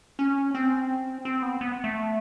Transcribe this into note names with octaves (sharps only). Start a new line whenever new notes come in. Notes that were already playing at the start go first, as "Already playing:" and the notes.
C#4
C4
C4
B3
B3
A3